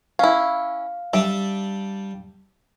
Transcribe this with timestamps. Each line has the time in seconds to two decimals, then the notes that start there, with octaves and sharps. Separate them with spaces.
0.19 C#4 E4 F5
1.13 G3 D4 E5